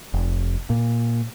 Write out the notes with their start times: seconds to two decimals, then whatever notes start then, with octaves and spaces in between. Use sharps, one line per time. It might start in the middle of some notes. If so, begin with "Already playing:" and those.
0.14 F1
0.70 A#2